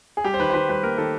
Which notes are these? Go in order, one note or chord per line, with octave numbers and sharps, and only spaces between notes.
G#4
G3 G4
C5
D#3 B4
C5
D#3 B4
G3 B4
A#3 A#4
D#3 A4